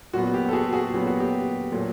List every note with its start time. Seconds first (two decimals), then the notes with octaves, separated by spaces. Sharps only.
0.13 A#2 F#3 B3 F#4
0.34 G4
0.49 A4
0.53 F#4 G#4
0.73 F#4 G#4
0.93 A#2 F#3 B3 G4
1.06 F#4
1.20 G4
1.72 A#2 F#3 A3